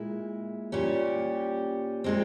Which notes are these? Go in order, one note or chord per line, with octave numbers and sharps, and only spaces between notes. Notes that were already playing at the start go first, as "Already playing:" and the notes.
Already playing: A#2 G#3 E4
A#2 G3 C#4 G4
A#2 G#3 C4